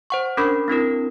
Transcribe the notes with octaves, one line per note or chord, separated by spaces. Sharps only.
C5 F#5 C#6
C#4 D4 A#4 B5 C#6
C4 D4 E4 A#4